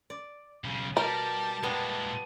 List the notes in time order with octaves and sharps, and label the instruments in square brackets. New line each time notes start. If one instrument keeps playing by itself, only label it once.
[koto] D5
[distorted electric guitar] B1 C#3
[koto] B2 [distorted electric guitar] G3 [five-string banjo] A#4 [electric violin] A5
[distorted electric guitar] A#2 G#3 [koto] G3 B3 A#5